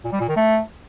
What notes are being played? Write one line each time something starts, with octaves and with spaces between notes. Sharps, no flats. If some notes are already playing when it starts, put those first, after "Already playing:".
A#2
G3
A#2
D#3
A3